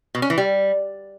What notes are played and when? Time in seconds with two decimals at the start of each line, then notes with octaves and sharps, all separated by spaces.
0.15 B2
0.22 C#4
0.30 E3
0.38 G3